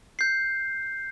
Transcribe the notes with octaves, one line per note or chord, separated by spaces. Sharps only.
G6 C7